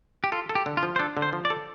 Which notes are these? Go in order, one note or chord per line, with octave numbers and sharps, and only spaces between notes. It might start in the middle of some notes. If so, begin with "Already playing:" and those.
G4
F4 A4
A4
G4
D3
F4
F3
C5
D4 A4
D3
C5
F3
D5
A4